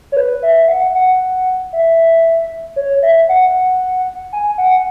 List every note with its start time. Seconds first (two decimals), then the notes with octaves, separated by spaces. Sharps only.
0.12 C#5
0.17 B4
0.43 E5
0.63 E5
0.68 F#5
0.95 F#5
1.73 E5
2.76 C#5
3.02 E5
3.29 F#5
4.33 G#5
4.58 F#5